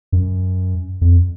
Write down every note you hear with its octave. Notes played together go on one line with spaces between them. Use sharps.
F#2
F2